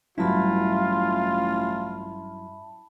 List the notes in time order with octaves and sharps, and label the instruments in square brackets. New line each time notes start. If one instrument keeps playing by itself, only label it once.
[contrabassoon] A1 [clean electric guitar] G2 F#3 E4 [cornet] F4 [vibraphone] E5 A5 B5